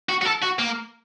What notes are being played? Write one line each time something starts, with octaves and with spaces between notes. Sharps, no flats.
F#4
F#4
A4
F#4
A#3